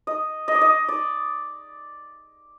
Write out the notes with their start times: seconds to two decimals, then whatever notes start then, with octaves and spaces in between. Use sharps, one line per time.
0.07 D#5
0.48 D#5
0.55 D5
0.61 D#5
0.88 D5